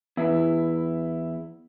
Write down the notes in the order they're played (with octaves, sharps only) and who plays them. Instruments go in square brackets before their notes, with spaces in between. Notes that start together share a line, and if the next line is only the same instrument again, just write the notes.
[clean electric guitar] E2 [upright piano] E4